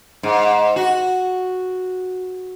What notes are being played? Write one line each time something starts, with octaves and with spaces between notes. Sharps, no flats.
G#2
F#4